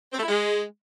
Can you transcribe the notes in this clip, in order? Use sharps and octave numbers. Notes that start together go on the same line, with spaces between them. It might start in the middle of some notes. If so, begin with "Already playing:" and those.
C4
A3
E4
G#3